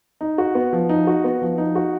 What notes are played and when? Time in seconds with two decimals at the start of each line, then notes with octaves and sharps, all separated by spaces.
0.21 D#4
0.38 F#4
0.55 B3
0.73 F3
0.89 D#4
1.07 F#4
1.24 B3
1.42 F3
1.58 D#4
1.75 F#4